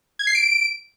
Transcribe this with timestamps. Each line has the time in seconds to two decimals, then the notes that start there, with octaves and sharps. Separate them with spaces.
0.19 G#6
0.27 C7
0.35 D7